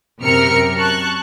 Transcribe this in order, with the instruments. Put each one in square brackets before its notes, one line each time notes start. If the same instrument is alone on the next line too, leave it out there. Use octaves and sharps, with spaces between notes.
[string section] F#2 C3 A#4 F6 C#7
A5 C#6 F#6